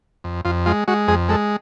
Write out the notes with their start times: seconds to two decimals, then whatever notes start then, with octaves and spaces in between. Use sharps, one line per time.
0.24 F2
0.45 F2 F4
0.66 G#3 F4
0.88 G#3 F#4
1.08 F2 G#4
1.29 G#3 A4